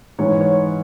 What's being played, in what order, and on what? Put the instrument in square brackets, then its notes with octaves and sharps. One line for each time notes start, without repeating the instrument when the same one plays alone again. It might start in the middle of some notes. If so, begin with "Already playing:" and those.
[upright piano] G#2 E3 C#5
C#5